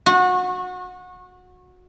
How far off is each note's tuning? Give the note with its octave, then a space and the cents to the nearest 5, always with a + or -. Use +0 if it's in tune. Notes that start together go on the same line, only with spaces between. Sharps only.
F#4 -25